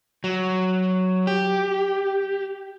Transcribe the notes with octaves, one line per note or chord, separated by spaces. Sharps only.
F#3
G4